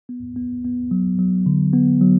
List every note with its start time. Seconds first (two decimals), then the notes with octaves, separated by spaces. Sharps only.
0.09 B3
0.36 B3
0.64 B3
0.91 F#3
1.19 F#3
1.46 D3
1.73 B3
2.01 F#3